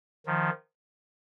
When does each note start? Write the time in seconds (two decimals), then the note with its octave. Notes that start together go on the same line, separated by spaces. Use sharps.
0.26 D#3 F3